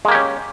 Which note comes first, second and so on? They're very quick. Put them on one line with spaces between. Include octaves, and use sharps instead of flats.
G#3 A#3 G4 C#4